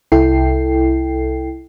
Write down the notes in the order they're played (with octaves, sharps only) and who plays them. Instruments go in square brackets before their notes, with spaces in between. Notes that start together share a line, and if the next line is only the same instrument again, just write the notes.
[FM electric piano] C2 E4 A4 G5 C7